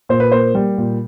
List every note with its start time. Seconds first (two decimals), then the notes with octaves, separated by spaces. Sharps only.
0.09 A#2 C5
0.20 B4
0.32 A#3 C5
0.55 G3
0.78 A#2